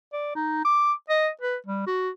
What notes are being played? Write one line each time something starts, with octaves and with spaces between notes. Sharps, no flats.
D5
D#4
D6
D#5
B4
G3
F#4